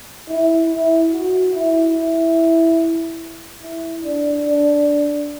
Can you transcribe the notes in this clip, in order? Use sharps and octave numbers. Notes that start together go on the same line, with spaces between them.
E4
E4
F#4
E4
E4
E4
D4
D4